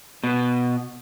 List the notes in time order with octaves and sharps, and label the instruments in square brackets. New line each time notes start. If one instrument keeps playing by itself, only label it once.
[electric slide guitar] B2